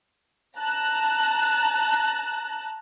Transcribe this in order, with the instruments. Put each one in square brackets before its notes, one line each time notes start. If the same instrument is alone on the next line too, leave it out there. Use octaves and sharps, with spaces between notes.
[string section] A5 A#5 F#6